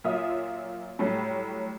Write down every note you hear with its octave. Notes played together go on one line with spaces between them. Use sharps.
A#2 F#3 F4 E5 D#6
A2 F#3 G3